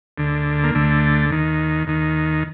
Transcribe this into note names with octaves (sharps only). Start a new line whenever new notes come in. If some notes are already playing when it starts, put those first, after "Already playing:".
D2 D3
A#3
D2 D3 A3
D#2 D#3
D#2 D#3